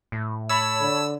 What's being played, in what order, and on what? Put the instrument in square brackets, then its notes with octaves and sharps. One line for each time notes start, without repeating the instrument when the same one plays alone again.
[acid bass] A2
[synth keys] C#5 A5 B5 [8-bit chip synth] E6
[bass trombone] D3